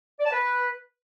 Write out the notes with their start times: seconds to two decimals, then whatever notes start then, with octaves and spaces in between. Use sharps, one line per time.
0.20 D5
0.26 A5
0.32 B4